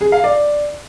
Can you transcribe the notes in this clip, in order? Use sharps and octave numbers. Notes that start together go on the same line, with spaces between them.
G#4
F5
D5